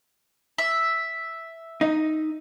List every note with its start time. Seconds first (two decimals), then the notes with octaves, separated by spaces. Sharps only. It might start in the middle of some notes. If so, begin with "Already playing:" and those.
0.58 E5
1.81 D#4